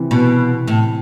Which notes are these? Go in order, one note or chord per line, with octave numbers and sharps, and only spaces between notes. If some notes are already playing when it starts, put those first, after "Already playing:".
Already playing: C3 E3
B2
A2